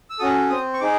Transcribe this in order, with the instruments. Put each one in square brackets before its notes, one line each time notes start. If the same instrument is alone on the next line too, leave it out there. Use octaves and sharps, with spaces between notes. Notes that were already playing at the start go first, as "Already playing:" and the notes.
[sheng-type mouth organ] E6
C#4 F#4 A4 D#6
C4 D#6
C#6
D#4 G#4 D6